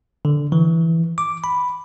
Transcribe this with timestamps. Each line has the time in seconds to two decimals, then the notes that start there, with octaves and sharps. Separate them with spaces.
0.25 D3
0.52 E3
1.18 D6
1.44 B5